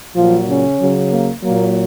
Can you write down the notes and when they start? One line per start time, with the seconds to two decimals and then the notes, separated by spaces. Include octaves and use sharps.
0.14 A#2 F3 F#3 F4
0.47 C#3 C#4
0.78 C#3 F#3
1.10 A#3
1.41 A#2 F#3 A#3